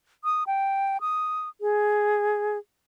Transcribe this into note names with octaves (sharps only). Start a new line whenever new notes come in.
D#6
G5
D#6
G#4